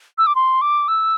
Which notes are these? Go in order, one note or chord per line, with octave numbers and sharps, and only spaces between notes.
E6
D6
C6
D6
E6